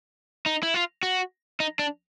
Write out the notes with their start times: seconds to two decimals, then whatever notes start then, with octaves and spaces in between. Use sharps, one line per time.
0.46 D#4
0.63 E4
0.74 F4
1.03 F#4
1.60 D#4
1.79 D4